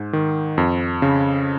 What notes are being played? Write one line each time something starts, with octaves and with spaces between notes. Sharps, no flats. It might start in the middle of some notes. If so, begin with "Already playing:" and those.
Already playing: G#2
D#3
F2
C#3